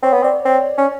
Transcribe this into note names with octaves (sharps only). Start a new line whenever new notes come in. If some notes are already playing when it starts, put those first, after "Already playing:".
C4 C#5
B3
C4 D5
C4
C#4